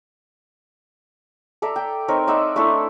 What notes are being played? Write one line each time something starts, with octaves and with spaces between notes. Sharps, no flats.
A4 D5 E5 A#5
G5
C4 D#4 A#4 C#5
D#4 D5 E5 F#5
A3 D4 E4 A4